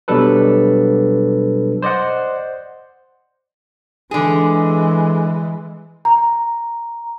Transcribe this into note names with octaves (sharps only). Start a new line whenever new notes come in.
B2 F#3 G3 D4 A4 B4
C5 D5 D#5 F#5
D3 E3 G#3 G#4
A#5